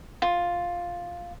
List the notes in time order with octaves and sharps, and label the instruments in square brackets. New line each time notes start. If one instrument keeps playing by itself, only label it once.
[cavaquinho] F4